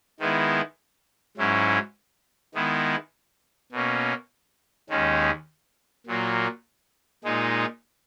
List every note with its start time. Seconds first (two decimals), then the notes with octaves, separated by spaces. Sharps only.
0.20 D#3 G#3 B3 E4
1.37 G#2 F#3 C#4 E4
2.54 D#3 G#3 B3 E4
3.72 B2 A#3 C#4
4.89 D#2 D#3 G#3 C#4
6.07 A#2 F#3 A#3
7.24 A#2 G#3 D#4